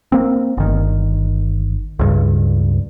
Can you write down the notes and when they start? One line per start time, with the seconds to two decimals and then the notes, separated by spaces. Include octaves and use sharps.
0.12 A#3 C4
0.57 G1 D#3
1.99 C#2 G2